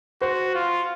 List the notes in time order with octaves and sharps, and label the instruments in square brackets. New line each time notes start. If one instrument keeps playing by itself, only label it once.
[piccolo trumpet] F#4 [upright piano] C5
[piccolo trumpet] F4